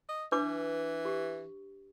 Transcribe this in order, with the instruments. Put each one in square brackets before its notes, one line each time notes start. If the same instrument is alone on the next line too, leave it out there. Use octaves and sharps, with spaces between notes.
[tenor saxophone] D#5
[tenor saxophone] E3 [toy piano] D4 B4 D6
[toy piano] G4